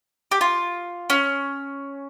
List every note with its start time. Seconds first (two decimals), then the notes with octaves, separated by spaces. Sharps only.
0.31 G4
0.41 F4
1.10 C#4